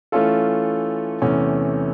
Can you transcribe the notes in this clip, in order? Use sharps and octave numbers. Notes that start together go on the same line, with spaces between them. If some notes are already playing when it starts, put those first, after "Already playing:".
E3 A3 C#4 F4 A4
E2 C3 E3 A3 C#4